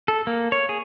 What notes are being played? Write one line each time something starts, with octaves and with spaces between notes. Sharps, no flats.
A4
A#3
C#5
G#4